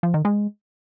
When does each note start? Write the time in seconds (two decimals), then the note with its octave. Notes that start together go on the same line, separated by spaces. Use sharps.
0.03 F3
0.14 D#3
0.25 G#3